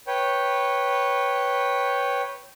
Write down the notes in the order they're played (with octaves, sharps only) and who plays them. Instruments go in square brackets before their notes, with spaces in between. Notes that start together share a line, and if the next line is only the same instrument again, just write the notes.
[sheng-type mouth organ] B4 C#5 G5